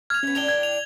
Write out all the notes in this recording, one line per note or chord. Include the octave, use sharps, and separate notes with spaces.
F6 G#6 F7
A3 B3 C#4
A2 D4 G5 F7 G7
G#6
F7